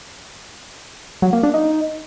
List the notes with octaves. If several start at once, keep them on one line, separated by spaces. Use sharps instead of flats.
F#3
A#3
D4
D#4